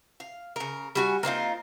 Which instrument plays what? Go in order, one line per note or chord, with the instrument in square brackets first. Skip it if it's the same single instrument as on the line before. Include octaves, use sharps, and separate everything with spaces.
[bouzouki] F5
C#3 A#4
G3 F#4 G#5
A#3 C4 D#4 F4